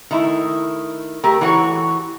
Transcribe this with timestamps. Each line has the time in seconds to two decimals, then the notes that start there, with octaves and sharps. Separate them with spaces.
0.11 D#3 A3 E4
1.23 A3 G4 A#4
1.41 E3 D4 F#4 A4 C#5